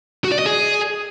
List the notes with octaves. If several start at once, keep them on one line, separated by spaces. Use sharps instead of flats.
F#4
D5
D#5
G#4